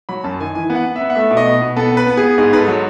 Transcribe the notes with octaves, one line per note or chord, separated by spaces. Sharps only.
F#3 B5
F#2 A5
D#3 G#5
E3 G#5
B3
F#5
B3
E5
B3
F#5
A3 E5
B2
D#5
B2
B2
B3 A4
B3
B4
B3
G#4
B3
G#2 G#4
G#2 B4
A4
F#3